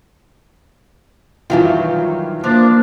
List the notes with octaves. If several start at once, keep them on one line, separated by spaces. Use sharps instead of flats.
D#3 E3 F#3 G3 E4 F4
F3 A#3 D4